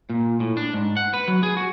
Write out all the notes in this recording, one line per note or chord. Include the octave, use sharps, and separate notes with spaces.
A#2
A2
D4
G#2
F#5
B4
F#3
G#4
F#4